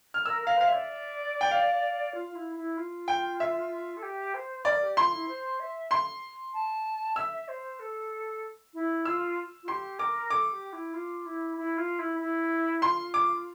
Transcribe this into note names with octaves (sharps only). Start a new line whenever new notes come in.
F6
A#4 E6
A#4
F5
C5 F5
D5 E5
G5
F5
F4
F4
E4
E4
F4
G5
E5
A4
G4
C5
A#4 D5
G4
F4 C6
E4
C5
E5
C6
A5
E5 E6
C5
A4
E4
F4 E6
F4
G4 C6
A#4 D6
A4 D6
G4
E4
F4
E4
E4
F4
E4
E4
F4 C6
D6